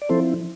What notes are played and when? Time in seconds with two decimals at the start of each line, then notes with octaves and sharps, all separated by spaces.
0.02 D5
0.09 F3 C4 E4 A4 C5